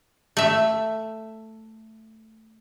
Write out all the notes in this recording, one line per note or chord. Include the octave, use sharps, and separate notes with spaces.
A3 E5